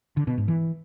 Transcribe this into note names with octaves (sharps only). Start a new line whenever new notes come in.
D3
B2
G#2
E3